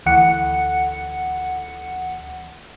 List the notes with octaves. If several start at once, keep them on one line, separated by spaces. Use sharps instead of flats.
D2 E3 F#5 C#7